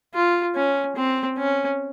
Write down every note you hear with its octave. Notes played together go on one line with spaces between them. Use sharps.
F4
C#4
C4
C#4